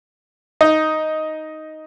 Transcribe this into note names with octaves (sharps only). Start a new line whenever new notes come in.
D#4